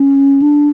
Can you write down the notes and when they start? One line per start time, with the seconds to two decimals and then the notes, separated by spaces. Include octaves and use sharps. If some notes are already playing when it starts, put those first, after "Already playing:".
Already playing: C#4
0.42 D4